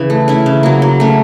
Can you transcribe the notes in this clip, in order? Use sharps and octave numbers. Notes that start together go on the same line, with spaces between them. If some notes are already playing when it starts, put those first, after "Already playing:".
Already playing: C#3 E3
A3
C#4 E4
C#3
F#3 A#3
F#3
A3 C#4